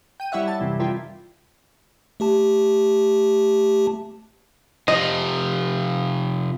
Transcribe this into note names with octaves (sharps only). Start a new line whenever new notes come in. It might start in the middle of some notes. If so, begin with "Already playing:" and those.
G5 D#7
G3 E4 C#5 E5 F#5
A5
F#2 C3 E3 G3
D#3 F3 G3 E4 F4 G4
A3 G4 A5
C3 F3 D#5